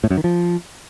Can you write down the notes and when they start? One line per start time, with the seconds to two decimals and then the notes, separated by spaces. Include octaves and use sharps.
0.04 A2
0.10 F#2
0.17 D#3
0.24 F3